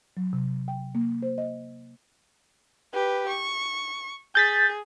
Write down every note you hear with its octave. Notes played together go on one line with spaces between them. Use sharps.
F#3
C3
G5
A#3
C5
D#5
G4 B4
C#6
G#4 G6 A6 B6